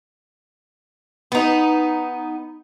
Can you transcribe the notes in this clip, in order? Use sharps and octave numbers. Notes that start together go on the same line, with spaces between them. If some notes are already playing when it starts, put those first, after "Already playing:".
B3 D#4